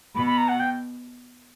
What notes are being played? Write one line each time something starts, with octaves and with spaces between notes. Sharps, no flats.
B2 B5
B5
A#5
F#5
G5